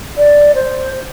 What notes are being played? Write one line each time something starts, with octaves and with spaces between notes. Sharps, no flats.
D5
C5